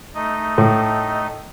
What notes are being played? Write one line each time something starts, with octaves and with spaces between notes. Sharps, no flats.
A3 D#4 D#5
A2